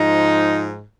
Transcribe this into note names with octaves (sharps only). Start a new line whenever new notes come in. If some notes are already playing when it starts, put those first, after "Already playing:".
Already playing: G#2 F3 D#4